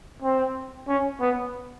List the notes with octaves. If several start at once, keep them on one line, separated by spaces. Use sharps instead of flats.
C4
C#4
B3